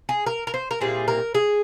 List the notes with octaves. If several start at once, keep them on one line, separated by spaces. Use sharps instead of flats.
G#4
A#4
A#4
C5
A#4
A#2 G3 C4 E4 G#4
A#4
G#4